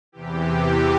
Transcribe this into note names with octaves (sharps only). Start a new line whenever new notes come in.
E2 C3 E3 G4